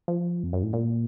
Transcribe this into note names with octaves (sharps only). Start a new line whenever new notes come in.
F3
F2
F#2
A2
A#2